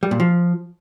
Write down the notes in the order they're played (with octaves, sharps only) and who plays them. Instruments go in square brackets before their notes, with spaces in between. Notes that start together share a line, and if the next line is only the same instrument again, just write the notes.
[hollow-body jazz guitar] G3
A#2
F3